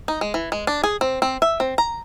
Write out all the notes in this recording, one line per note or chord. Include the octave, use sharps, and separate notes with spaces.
D#4
G#3
E3
G#3
D4
G#4
C4
C4
E5
C4
A#5